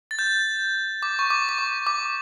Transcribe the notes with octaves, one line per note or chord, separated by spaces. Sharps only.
A6
G6
D6
C#6
D6
D6
C#6
D6